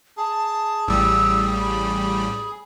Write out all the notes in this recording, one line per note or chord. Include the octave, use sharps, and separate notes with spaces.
G#4 A5
A1 G3 E6
B5